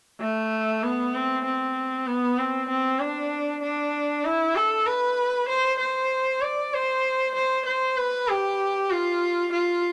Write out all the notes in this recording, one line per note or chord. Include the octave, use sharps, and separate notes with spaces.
A3
B3
C4
C4
B3
C4
C4
D4
D4
E4
A4
B4
C5
C5
D5
C5
C5
C5
B4
G4
F4
F4